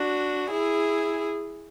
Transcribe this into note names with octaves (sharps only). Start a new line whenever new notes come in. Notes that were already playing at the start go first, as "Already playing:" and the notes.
Already playing: D4 F#4
E4 G#4